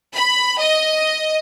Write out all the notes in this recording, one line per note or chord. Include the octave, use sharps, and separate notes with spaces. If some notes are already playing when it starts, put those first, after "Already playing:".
B5
D#5